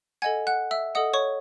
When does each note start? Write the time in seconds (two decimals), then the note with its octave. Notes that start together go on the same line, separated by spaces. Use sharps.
0.22 A4 D#5 F#5 G#5 G#6
0.47 F#5 F#6
0.71 E5 E6
0.95 A4 D#5 F#5 D#6
1.13 C#5 C#6